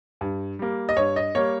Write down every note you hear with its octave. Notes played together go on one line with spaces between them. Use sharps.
G2
G3 A#3
D#5
G2 C#5
D#5
G3 A#3 C#5